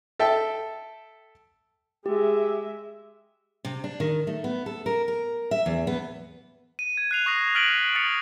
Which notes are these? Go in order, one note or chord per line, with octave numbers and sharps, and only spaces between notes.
A4 E5 G5 A5
G#3 G4 E5
C3
D4
D#3
A3
B3
A4
A#4
A#4
E5
E2
B3
D#7
G#6
F#6 C7 F7
C#6 D#6 A#6 C7
F6 A6 B6 D7 D#7 F#7
D#6 A6 B6 C#7 F7 F#7